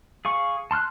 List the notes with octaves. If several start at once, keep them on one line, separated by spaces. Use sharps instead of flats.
G#4 F5 C#6
A5 C6 F6 F#6